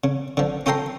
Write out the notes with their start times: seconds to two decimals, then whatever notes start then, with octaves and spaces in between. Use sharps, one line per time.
0.04 C#3
0.37 D3 F3
0.66 C#4 F4 A4 G5 A#5 C6